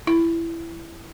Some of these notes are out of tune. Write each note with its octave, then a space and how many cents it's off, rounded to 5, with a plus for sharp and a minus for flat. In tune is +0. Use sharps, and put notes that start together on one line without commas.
E4 +15